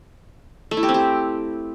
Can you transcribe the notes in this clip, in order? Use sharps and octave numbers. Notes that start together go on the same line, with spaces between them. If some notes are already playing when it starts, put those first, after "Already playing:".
A3
E4
G4
C4
G4